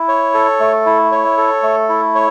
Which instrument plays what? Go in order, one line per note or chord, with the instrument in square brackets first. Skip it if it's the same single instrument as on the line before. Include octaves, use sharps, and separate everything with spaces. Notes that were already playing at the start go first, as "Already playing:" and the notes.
Already playing: [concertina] E4
C#5
A4
A3
E4
C#5
A4
A3
E4
C#5